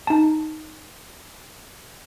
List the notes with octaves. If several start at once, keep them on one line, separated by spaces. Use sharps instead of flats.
D#4 A5